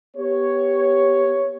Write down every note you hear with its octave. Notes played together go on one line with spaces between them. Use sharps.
B3 G4 C#5